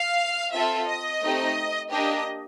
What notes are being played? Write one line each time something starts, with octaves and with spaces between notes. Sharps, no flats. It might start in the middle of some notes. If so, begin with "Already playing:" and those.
Already playing: F5
C4 F4 A4 E5
D#5
A3 C4 D#4 G4
A#3 D4 G4 D#5